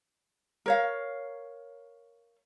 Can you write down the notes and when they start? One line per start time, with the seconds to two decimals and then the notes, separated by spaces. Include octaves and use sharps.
0.66 A#4 C#5 F5